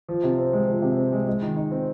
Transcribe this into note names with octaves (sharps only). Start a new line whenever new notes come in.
F3
C3
C4
G#3
F3
C3
C4
G#3
G#3
D#3
D#4
C4